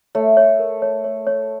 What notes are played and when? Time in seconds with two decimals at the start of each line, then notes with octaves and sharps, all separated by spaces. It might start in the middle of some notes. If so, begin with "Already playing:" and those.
0.15 A3 C#5
0.37 C#5
0.59 A#4
0.82 C#5
1.04 C#5
1.27 C#5